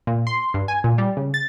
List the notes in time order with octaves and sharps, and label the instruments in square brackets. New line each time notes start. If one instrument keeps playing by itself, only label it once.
[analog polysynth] A#2
C6
G2
G#5
A#2
G3
C#3
A6